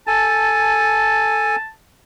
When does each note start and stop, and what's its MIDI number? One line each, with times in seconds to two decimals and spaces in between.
0.07 1.56 69
0.07 1.56 80
0.07 1.70 81